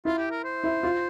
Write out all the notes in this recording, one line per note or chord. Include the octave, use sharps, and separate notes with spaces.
E4 F4
G4
A#4
C5
E4
F4